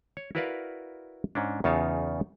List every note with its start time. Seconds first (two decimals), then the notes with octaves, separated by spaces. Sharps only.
0.17 C#5
0.35 E4 F#4 A#4 B4 D5 F5
1.35 G#2 C#4 D4
1.64 E2 C#3 D#4 F4 C#5 A5